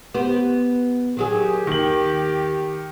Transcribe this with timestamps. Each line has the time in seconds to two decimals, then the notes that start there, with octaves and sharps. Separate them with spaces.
0.14 B3 G4 C5
1.17 D#3 F#3 G4 G#4
1.67 D#2 D#3 F#7